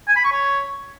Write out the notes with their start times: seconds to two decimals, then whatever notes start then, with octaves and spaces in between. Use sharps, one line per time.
0.08 G#5
0.16 B5
0.24 C#6
0.32 C#5